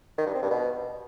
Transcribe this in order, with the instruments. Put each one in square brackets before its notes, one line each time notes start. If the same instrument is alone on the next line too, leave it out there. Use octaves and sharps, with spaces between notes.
[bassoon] D#3
G2
C4
G2
B2